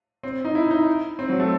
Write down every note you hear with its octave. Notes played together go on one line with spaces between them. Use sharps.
C4
D#4
E4
D#4
C4
F#3
A3